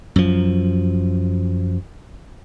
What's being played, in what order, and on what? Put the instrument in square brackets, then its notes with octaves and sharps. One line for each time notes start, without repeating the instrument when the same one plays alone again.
[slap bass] F#2 F3